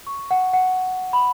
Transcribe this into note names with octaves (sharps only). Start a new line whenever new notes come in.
C#6
F#5
F#5
B5